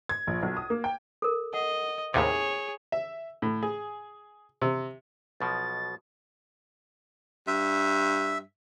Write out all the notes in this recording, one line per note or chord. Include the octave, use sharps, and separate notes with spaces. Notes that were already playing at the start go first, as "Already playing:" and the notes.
G#6
A#1
B1
D#6
A#3
G5
A4 A#4
D#5 F#5
D#2 A2 C3 G#4 C#5
E5
A2
G#4
C3
B1 B2 F3 A6
G2 E5